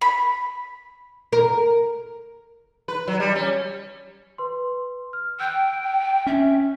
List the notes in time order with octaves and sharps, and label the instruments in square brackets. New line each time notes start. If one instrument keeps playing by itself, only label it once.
[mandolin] B5
[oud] A#4
[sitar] B4
F#3
G3
C#4
[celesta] B4 C6
F6
[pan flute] G5 [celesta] E6 F#6 G6
[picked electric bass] C#4 [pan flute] E5